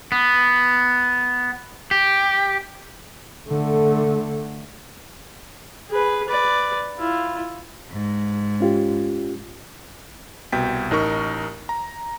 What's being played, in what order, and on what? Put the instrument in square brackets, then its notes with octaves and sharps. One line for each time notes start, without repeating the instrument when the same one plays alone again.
[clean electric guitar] B3
G4
[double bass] D3 A3
[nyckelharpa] G#4 B4
B4 D5
E4 F4
[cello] G#2
[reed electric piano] C#4 F4 G4
[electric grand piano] C2 B2 G5 B6
A1 D#4 A#4 C#6
A#5